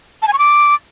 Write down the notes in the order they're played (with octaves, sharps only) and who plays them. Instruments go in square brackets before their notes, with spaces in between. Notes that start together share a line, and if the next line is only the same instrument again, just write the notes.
[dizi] A5
G#5
C#6
D6